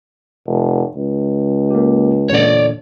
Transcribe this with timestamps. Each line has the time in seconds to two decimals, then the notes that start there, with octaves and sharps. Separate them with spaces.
0.47 F1
0.95 C#2
1.70 A#3 G4
2.30 E2 A#2 D3 C#5 D5